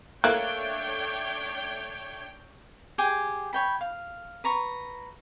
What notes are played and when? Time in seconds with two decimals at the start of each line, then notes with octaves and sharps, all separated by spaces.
0.24 A3 A#3 D4 C#5 G5 F#6
2.98 G4 G#4 G5 G#5
3.53 C#5 G5 B5
3.81 F5
4.44 B4 A#5 C#6